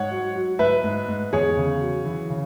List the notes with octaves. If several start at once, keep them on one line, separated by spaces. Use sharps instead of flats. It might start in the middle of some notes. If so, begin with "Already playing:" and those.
Already playing: G#2 C#5 F#5
F#3
F#3
G#2 B4 E5
G#2
G#2
E2 G#4 C#5
C#3
F#3
E3
C#3